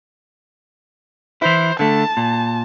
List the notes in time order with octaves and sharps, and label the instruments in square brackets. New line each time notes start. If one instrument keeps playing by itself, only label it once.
[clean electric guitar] E3 E4 [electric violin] C5
[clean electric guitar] D3 A3 [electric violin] A5
[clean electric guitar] A#2